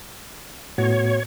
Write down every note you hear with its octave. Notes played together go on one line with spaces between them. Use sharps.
A2 B3 F#4 C#5